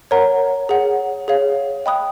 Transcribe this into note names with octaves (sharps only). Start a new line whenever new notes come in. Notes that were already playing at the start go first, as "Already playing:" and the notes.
A#4 C#5 F#5 A#5
G#4 C#5 F#5
G#4 C#5 F5
D#5 G5 B5 D#6 F#6